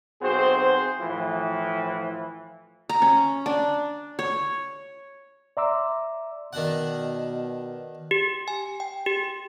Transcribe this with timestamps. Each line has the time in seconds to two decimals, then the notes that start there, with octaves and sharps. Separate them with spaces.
0.22 B1 C4 F#4 G#4 C5
1.00 A2 E3 F3
2.89 A#5
3.02 C#4
3.46 D4
4.19 C#5
5.57 D5 E5 A#5 C6 D6 E6
6.53 B2 D#3 D4 F#5
8.11 G4
8.48 G#5
8.80 G5
9.06 G4